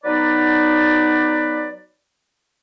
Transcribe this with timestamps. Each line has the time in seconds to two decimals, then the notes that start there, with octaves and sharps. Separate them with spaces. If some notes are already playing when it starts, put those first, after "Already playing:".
0.04 F#3 B3 D#4 B4 D5